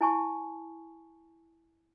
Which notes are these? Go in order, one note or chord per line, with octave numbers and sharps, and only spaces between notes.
E4 G#5 A5 C#6